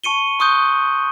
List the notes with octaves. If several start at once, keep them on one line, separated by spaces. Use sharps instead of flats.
A5 C#6 C#7 D#7 G7
C6 C#6 D#6 F#6 G6